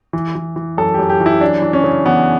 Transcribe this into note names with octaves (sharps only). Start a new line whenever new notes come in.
E3
E3
E3
F#2 A4
G4
F#2
G4
E3
E4
F#2 D4
E3
C#4
C#3
E3 B3